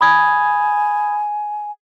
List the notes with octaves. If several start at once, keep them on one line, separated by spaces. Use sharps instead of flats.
G#5 B5 D#6 G#6